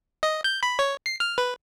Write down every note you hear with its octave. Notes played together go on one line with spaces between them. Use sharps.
D#5
G6
B5
C#5
C7
F6
B4